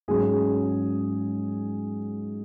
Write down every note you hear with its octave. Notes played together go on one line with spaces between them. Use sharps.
G#2 F#3 C#4 G#4